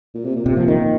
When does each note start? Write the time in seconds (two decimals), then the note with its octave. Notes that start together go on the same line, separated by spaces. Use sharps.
0.14 A#2
0.24 C3
0.36 A#2
0.46 C3
0.57 F3
0.68 D#3